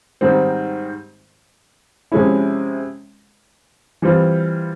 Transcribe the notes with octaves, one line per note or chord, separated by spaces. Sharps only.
G#2 D#3 G3 C4
C3 F3 G#3 C#4 E4
E3 G3 C4 F4